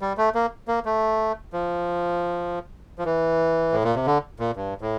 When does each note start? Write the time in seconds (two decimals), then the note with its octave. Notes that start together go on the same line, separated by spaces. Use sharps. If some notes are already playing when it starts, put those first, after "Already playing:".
0.01 G3
0.18 A3
0.35 A#3
0.68 A#3
0.85 A3
1.53 F3
2.99 F3
3.05 E3
3.72 A2
3.84 A#2
3.95 C3
4.06 D3
4.40 A#2
4.56 G2
4.81 A2